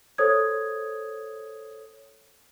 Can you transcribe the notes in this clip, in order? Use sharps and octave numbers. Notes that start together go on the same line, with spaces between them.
A4 C5 C#5 D#6 G#6